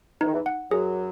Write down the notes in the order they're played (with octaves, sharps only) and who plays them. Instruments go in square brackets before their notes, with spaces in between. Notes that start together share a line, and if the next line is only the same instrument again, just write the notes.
[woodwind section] E2 E3 [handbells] D#4
[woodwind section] D#3
E2 E3
[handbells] F#5
[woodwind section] F#2 F#3 [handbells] G#4